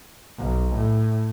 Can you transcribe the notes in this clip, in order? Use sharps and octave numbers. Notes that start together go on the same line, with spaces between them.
B1
A2